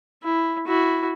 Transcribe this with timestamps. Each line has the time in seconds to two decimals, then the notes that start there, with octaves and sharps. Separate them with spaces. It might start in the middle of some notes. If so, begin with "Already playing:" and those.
0.23 E4
0.67 E4 F#4